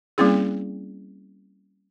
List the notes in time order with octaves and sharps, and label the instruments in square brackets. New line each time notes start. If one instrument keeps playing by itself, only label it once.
[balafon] G3 A#3 C4 C#4 E4 G#4